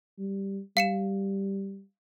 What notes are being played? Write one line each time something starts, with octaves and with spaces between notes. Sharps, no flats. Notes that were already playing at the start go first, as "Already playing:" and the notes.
G3
G3 F5 C#7 E7